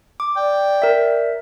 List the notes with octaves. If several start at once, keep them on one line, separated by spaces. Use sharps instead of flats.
D6
D5 G5
A#4 E5